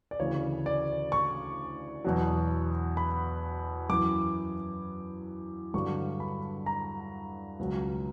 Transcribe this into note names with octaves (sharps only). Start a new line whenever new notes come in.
D5
D2 C#3 E3 C#5
D5
C#6
E2 B2 F#3
B5
F#2 E3 D6
G2 D3 F#3 C#6
B5
A#5
C#2 B2 F#3